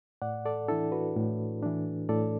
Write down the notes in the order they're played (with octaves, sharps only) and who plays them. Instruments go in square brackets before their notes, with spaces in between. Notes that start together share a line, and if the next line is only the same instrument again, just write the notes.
[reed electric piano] A2 D5 F#5
A4 D5
E3 D4 E4 A4
F#4 B4
A2
E3 D4
A2 A4 D5